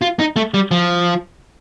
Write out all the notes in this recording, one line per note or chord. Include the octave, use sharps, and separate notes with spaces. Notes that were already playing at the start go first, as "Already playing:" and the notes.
F4
D#4
A3
G3
F3